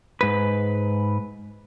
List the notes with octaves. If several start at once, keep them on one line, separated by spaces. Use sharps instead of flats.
G#2 B4